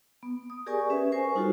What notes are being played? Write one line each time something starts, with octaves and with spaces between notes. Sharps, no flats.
B3
D#6
G4 G#4 A#4 D5 G#5 C#6
C#4 B4 E5
A#4 C5 G#5 C#6
G3 D#4 F4 F#4 A4 C5